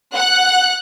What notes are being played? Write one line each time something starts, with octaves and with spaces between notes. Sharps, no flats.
F#5 F#6